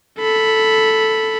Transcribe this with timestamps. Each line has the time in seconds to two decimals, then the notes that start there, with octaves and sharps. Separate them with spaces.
0.20 A4 B5